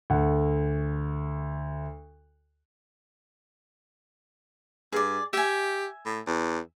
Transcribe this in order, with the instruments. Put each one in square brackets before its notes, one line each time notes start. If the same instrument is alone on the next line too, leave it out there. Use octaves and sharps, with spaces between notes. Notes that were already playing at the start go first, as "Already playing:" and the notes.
[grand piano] D2 A3 F#5
[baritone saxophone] G2 [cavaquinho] G#4 D5
[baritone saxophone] G4 [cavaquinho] E5 G#5
[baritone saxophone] A2
E2